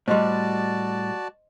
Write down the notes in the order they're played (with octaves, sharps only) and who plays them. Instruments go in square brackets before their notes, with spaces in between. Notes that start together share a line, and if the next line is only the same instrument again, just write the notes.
[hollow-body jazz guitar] A2 G3 [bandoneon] F#4 D5 A5 [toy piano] C5 D#5 C6